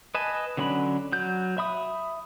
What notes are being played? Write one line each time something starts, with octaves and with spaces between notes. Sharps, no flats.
B4 D#5 G#5 A5
D3 F#3 C#4 D4 B5
F#3 G6
E5 B5 D#6